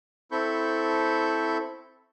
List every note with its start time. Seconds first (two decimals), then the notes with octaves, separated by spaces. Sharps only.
0.31 C4 E4 A4 B5 C#6 G6